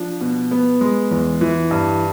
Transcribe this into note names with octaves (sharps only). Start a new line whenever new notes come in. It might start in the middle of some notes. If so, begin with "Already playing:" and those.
Already playing: F3 D4
B2
B3
G#3
E2
E3
G2